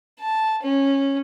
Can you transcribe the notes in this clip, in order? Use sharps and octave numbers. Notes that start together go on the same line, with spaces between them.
A5
C#4